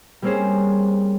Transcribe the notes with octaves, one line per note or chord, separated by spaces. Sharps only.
G3 A#3 C4 C#4 G#4 C5